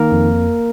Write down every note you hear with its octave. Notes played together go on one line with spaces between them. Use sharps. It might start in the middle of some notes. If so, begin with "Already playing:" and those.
Already playing: D#3 A#3 A#4
F2